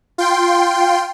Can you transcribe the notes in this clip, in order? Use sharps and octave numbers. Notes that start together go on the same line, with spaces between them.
F4 G5 C6